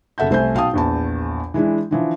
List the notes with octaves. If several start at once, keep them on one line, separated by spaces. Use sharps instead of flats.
F#1 A4 E5 F#5 G6
C2 A3 C5 E5 G#5 G6
B1 F5 G5 A5 D#6
A#1 E2 A5
E3 G#3 D4 E4
D3 E3 F3